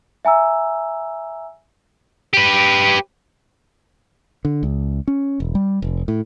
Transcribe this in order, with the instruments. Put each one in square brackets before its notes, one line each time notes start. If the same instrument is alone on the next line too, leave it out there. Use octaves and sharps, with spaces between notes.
[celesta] E5 G#5 A#5 E6
[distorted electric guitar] G4 B4
[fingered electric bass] D3
C#2
C#4
E1
G3
F1
A2